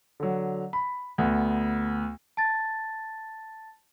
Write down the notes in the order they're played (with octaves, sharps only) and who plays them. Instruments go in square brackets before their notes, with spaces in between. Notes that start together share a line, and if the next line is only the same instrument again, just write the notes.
[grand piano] D3 F#3
B5
D2 B3
[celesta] A5 A6